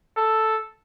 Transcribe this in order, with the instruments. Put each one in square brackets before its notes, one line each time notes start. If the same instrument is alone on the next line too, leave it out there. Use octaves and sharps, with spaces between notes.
[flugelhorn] A4